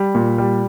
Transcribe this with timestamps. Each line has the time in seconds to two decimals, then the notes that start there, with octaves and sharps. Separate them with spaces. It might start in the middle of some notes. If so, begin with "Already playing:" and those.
Already playing: G3
0.15 A#2
0.38 G3